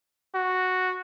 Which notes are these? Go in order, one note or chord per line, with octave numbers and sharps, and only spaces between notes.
F#4